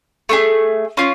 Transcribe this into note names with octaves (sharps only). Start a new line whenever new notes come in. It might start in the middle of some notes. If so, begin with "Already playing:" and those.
A3 D4 G#4
C#4 F4